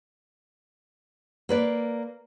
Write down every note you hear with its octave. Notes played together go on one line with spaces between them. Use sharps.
A#3 B4 D5